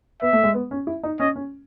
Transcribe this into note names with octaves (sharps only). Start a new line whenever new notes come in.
B3 E5
A3
G#3
B3
C#4
E4
D#4
C#4 D#5
C#4